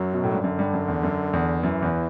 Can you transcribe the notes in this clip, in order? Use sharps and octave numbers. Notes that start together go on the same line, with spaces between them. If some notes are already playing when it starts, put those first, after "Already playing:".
Already playing: F#2 F#3
B2
A2
G2
F#2 D3
G2
F#2
E2
F#2
E2
F#2 E3
E2